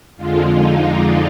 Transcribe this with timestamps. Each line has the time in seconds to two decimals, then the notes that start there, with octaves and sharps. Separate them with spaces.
0.16 F2 D3 F3 G#3 F4
0.53 D#4
0.89 D4